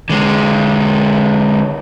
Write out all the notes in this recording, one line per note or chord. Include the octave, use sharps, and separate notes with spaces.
D3 G#3